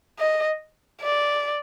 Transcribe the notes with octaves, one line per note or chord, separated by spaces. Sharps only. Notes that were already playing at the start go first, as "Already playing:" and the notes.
D#5
D5